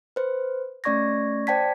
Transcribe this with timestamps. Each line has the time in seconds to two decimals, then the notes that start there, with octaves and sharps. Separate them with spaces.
0.16 B4 C5
0.84 A3 C#4 D5 C#6 G#6 A#6
1.47 C5 D5 G5 A5 G#6 B6